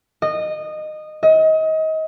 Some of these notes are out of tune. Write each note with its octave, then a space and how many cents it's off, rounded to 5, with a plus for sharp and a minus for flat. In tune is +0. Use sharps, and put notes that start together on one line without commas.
D#5 -20
D#5 +30